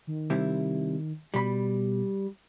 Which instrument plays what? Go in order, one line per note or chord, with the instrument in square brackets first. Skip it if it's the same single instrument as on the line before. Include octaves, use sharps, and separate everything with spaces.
[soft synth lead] D#3
[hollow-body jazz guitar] C3 G3 E4
[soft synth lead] B2 [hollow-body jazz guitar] G3 B5